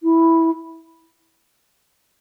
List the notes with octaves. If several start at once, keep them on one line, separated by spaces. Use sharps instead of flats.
E4